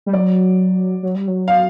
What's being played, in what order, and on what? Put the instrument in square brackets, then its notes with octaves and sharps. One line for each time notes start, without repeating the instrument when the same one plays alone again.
[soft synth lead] G3
[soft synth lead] F#3 [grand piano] D5
[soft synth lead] F#3
G3
F#3
[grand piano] F5